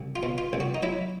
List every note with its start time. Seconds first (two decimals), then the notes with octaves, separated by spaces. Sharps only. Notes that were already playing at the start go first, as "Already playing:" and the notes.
Already playing: C2
0.16 F4
0.23 B2
0.38 F4
0.53 C2
0.60 F#4
0.75 D#4
0.83 F#3 E4